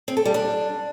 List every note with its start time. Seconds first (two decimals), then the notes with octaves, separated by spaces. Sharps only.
0.08 C4
0.17 A4
0.25 G3
0.34 D4